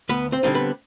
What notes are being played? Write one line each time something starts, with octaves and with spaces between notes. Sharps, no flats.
D2 B3 B4
C4 C5
D3 G3 C4 D#4
B3 B4